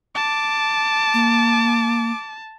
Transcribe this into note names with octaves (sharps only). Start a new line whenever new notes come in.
A5 D6
A#3